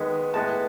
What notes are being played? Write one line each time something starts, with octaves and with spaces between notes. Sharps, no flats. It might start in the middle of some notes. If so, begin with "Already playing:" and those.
Already playing: D#2 D#3 G#3 B3
A2 G#3 B3 A5